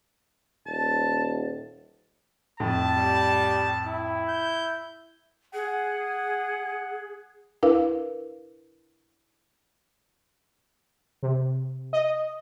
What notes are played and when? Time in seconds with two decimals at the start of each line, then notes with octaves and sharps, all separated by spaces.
0.66 D#1 A5
2.60 F2 A2 A5
2.96 G3
3.86 E4
4.29 G6
5.54 G#4 F#5
7.63 D4 E4 A#4 B4 F5
11.23 C3
11.93 D#5